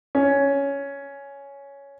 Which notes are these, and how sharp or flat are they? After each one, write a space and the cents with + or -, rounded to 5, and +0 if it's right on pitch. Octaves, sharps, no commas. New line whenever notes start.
C#4 +10